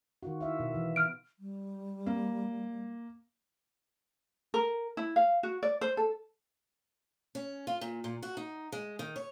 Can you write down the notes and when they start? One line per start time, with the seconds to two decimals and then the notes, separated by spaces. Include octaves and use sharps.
0.23 D#3 F4 F#4
0.41 E4 E5 F5
0.60 B2
0.75 E3
0.96 F6 D7
1.39 G3
2.06 A#3
4.54 A#4
4.97 E4
5.16 F5
5.43 F#4
5.63 D5
5.81 C5
5.97 A4
7.35 C#4
7.67 F4
7.81 A#2
8.04 A#2
8.23 F#4
8.37 D#4
8.72 G#3
8.99 D#3
9.16 C#5